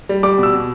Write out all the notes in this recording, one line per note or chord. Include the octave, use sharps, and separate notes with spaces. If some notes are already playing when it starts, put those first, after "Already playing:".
G3
G3 D6
B2 E6
B2